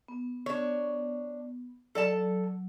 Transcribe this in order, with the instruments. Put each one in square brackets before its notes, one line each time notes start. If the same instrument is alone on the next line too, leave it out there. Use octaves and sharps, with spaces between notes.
[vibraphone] B3
[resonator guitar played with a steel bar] D4 C#5
[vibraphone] F#3 [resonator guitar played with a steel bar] A4 D5 A5